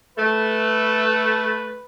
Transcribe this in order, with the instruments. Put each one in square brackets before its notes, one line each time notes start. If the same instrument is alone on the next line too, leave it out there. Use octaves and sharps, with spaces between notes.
[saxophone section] A3 [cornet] B4